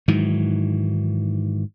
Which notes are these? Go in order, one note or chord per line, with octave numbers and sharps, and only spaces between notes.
G#2 D#3 E3 F#3